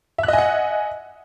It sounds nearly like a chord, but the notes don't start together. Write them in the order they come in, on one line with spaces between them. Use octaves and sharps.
E5 F#6 D#5 G#5 F#5